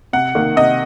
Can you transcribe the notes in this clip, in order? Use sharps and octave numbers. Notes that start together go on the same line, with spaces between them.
C3 F#5
D#3 A#3
C3 D#5